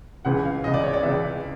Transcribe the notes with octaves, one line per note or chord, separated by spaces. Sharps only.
C#2 C#3 E3 F#5
F5
C#2 C#3 E3 D#5
D5
C#5
D5
C#2 C#3 E3 E5